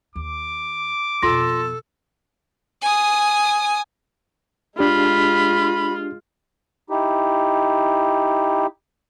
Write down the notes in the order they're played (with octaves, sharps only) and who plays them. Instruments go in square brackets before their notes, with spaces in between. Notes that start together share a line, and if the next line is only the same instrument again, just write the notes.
[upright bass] D#2 [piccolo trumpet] D6
[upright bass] F2 B2 [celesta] F4 C6 A#6 [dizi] A4
[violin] G#5 D#6
[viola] G#3 F4 [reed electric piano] D4 G4 [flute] B5
[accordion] D#4 E4 G4